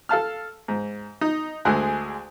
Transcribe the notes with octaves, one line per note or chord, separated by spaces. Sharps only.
A4 F5 A5 F6
G#2
D#4
D2 D3 G#3 G#4 F#6